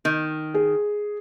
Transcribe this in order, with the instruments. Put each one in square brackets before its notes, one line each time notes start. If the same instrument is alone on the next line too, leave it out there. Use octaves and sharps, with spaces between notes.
[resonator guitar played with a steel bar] D#3
[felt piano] G#4